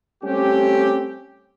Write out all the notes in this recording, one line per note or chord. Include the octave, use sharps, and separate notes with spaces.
G3 A3 C4 C#4 G4